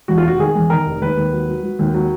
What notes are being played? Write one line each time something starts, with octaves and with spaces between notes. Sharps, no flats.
E2 F#4
F4
F1 F#4
D#3 G#4
E2
D#3 A#4
F1
D#2 B4
D#2
F#3
F#3
F#3
D#2
F#3